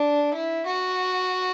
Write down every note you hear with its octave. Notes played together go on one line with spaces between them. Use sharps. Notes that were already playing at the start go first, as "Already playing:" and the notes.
Already playing: D4
E4
F#4